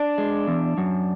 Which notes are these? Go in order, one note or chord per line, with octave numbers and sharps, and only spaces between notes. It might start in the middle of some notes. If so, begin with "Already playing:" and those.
Already playing: D4 D5
G#3
E2
F#2